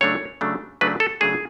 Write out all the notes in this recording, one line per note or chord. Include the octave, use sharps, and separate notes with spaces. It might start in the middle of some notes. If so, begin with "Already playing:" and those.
C#3 F#3 A3 D4 C#5
C#3 F#3 A3 D4
C#3 F#3 A3 D4 B4
A4
C#3 F#3 A3 D4 G#4